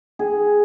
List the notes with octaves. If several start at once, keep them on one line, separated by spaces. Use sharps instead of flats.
G#4